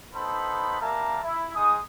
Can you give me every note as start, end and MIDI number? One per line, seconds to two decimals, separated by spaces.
0.14 0.80 59
0.14 0.80 63
0.14 0.80 69
0.14 0.80 72
0.14 0.80 83
0.81 1.22 55
0.81 1.22 58
0.81 1.22 70
0.81 1.22 76
0.81 1.22 81
0.81 1.22 82
1.23 1.51 64
1.55 1.77 56
1.55 1.77 63
1.55 1.77 68
1.55 1.77 87